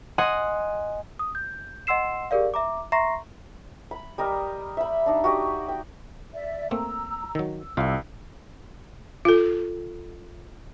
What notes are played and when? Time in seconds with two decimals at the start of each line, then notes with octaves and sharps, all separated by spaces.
0.18 D#5 F#5 G#5 C6
1.19 D#6
1.35 G6
1.87 D#5 F#5 C6 E6 C7 E7
2.31 G4 G#4 A#4 D5 F5
2.54 E5 A#5 D6
2.92 E5 A#5 C6 C#6 A#6 C7
3.91 B5
4.18 G3 A#4 D#5
4.77 E5 B5
5.06 D4 D#4
5.24 F#4 G4 D#5
5.68 G5
6.33 D5 E5
6.71 A3 A#3 C4 A#5 E6
7.35 D#3 F#3
7.62 E6
7.77 C2 F4 F5
9.25 F4 A4